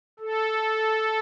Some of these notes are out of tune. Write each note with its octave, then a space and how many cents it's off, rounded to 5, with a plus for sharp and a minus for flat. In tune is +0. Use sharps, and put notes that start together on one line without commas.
A4 -5